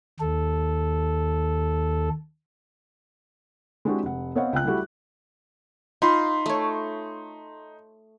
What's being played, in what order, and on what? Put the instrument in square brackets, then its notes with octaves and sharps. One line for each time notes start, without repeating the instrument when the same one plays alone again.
[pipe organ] D#2 A4
[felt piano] G#3 C4 D4 E4 F#4 G4
F1 F#5
B3 C4 C#5 D#5 F5 F#5
C#2 G5 F#6
G3 A3 E4 F#4 G4
[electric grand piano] D#4 B5 C6 [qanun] F4
[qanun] A3 C#5